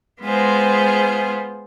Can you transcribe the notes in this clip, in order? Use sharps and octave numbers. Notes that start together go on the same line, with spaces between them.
G#3 B3 F4 G#4 C5